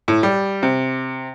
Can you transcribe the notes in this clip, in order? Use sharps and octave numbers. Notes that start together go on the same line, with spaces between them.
A2
G3
C3